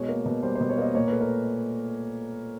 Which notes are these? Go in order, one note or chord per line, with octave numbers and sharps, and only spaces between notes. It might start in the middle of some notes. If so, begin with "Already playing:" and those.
Already playing: B2 G#3 C#5
A#3
B2
G3 C5
C5
B2
C#5
A#3 D#5
A#2 C#5
A3 B4
A#4